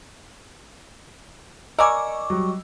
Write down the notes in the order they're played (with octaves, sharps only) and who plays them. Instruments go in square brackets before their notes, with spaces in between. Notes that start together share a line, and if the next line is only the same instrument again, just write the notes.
[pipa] A#4 D5 G#5 [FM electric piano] D#5 C#6 D6 [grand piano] E6
[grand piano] F#3 G3